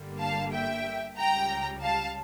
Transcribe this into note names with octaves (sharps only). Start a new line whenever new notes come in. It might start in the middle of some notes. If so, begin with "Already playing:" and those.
Already playing: G1 G2 D3 G3 A#3
F5 A5
E5 G5
C#2 C#3 G3 G5 A#5
F5 A5